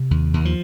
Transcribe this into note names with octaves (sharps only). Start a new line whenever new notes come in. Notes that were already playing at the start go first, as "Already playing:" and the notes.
Already playing: C3
D#2
D#2
F3